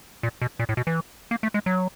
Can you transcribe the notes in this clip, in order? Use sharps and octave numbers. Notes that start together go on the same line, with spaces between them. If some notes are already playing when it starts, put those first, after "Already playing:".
A#2
B2
A#2
A2
B2
E3
A#3
A3
G#3
F#3